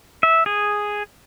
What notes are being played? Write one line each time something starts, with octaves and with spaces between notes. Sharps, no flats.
E5
G#4